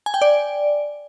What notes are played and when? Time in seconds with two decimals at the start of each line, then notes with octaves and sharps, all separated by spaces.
0.06 G#5
0.14 G5
0.22 D5